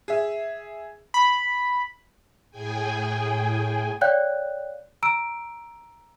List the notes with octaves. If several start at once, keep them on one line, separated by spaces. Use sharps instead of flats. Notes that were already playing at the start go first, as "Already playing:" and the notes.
G#4 E5
B5
A2 G#4 G5 G#5
C#5 D5 F5 G5 F#6 G6
A#5 E6 D7